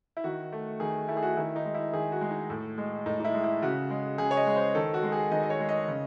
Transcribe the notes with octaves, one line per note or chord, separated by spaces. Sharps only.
E4
D#3 F#4
A3
D#3 G#4
A3 E4
G#4
F#4
D#3 E4
D#4
G#3
E4
D#3 G#4
F#4
G#3
D#4
A2
G#3
A2 D#4
D#4
E4
G#3
E4
C#3 F#4
G#3
C#3 G#4
C#5
D#5
G#3
C5
D#3 A4
F#4
G#3
G#4
D#3 D#5
D#5
C#5
G#3
D#5
C#3